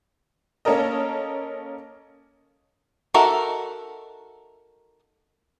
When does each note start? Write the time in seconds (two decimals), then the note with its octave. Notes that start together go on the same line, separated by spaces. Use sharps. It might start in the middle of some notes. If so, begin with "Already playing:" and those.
0.65 A#3 C#4 A4 A#4 D#5
3.14 D#4 F#4 A4 A#4 E5